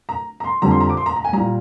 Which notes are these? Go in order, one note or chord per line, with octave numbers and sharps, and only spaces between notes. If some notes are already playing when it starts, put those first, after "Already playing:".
A#5
A#5
C6
F2 D3 G3 A#5
C6
A#5
D6
C6
A#5
A#5
G#5
A#2 G3 A#5